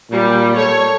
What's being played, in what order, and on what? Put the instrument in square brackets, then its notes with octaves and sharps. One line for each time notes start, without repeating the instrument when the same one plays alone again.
[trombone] A#2 [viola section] G3
[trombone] A4 [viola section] C#5